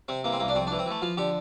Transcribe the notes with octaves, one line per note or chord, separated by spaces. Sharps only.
C3 C4
E3 A#3
C4
C2 A#3
D4
F2 C4
D4
E3
C4
E3 A3
F3 F4
D3 G4